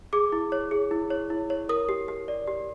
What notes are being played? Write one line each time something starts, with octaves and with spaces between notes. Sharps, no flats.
G#4 D6
E4
C#5
G#4
E4
C#5
E4
C#5
A#4 D#6
G4
G4
D5
G4